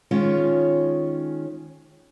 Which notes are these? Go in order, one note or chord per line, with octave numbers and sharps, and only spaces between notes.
D#3 G#3 C#4 F4 C#5